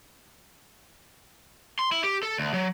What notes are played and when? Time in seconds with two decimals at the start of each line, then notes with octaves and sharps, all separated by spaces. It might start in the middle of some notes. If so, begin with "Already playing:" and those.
1.79 C6
1.92 E4
2.04 G4
2.23 A4
2.38 D2
2.54 F#3